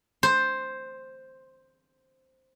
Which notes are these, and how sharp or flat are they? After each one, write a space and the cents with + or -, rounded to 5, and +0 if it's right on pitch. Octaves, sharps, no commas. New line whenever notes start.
C5 +5